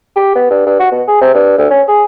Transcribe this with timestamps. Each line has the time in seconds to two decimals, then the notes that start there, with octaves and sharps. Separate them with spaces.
0.16 G4
0.35 B3
0.50 G2
0.67 G2
0.80 F#4
0.91 B2
1.08 G#4
1.21 C3
1.34 G2
1.58 D2
1.71 C#4
1.88 G#4